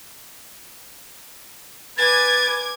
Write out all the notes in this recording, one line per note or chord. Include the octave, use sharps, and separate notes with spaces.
B4 G#5 D6 G#6 A6